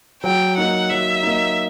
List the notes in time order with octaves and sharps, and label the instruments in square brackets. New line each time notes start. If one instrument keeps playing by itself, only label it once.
[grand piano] F#3 [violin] G5
[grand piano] A#3 D#4 [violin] F#5
[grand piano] F#3 [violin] E5
[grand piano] A#3 D#4